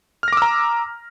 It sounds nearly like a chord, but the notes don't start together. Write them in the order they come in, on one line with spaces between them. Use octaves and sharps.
F6 A#6 D6 E6 A#5